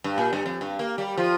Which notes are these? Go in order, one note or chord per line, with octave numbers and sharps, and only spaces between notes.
G2
A#2
G2
F2
G2
A#3
G3
F3 F4